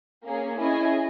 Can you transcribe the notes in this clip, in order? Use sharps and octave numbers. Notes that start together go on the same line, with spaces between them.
A#3 C#4 G#4
C#4 E4 G#4 D#5 G#5